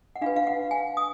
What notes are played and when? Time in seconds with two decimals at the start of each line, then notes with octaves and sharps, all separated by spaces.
0.16 F#5
0.21 D4 F4 B4 F5
0.36 F5
0.47 F#5
0.71 G#5
0.97 D#6